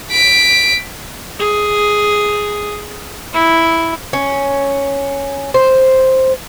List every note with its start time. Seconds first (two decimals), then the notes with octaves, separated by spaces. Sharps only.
0.12 B6 D7
1.39 G#4
3.34 E4
4.13 C#4
5.54 C5